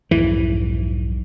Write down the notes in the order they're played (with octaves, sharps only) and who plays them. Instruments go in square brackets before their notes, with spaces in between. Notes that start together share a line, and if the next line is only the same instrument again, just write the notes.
[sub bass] B1 [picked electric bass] F2 G#2 [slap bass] E3